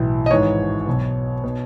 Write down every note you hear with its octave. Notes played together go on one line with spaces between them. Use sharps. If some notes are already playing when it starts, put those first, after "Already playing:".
Already playing: B1 A2 E3
D#5
G#1 G#2 E3 C#5
B1 B2
B2